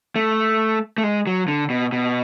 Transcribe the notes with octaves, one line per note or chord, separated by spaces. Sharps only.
A3
A3
G#3
F#3
D3
B2
B2